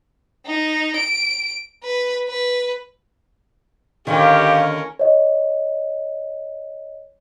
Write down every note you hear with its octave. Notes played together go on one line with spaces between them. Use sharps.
D#4
D7
B4
B4
D#2 D3 D#3 C#4 G4 A#4 F5
C#5 D#5